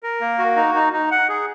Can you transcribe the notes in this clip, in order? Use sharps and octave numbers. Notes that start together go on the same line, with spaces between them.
A#4
A#3
F#4
D#4
D#4
D#4
F#5
G#4